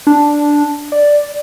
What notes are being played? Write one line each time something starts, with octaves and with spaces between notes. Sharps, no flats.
D4
D5